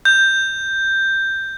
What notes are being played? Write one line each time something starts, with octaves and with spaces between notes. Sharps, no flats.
G6